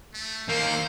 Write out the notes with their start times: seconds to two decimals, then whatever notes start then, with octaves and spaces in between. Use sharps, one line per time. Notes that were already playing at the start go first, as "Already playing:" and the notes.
0.14 A3
0.48 D#3 A#3 C5